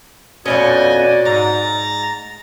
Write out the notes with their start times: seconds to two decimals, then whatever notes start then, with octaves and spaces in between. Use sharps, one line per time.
0.46 F2 B2 C#4 F#4 D5 D#5 G#5
1.25 G#2 A#5 A6